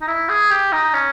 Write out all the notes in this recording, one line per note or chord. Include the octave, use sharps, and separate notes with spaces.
D#4
E4
G#4
G4
D#4
C#4